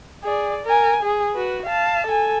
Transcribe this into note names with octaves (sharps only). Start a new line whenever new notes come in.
G#4 D5
A#4 G#5
G#4
F#4 B4
F5 A5
A4 G#5